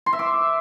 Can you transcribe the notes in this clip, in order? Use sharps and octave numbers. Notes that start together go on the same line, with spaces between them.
C6
E5
D6